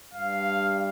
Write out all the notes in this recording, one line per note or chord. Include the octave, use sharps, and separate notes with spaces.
G2 F5